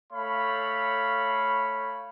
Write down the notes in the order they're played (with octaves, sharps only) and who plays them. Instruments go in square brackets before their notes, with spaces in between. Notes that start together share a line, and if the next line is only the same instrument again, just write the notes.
[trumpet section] A3 C#5 F5 B5